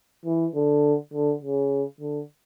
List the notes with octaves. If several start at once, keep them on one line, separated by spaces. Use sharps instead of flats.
E3
D3
D3
C#3
D3